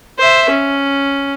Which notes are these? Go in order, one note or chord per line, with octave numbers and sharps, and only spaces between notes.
C5 E5
C#4